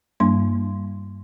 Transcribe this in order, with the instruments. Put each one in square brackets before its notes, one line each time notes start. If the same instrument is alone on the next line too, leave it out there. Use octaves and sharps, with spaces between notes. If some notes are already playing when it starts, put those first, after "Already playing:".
[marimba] G2 G3 A#3 D4 C6